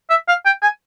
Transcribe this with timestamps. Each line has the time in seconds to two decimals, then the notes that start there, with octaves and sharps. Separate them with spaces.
0.10 E5
0.28 F5
0.46 G5
0.63 G#5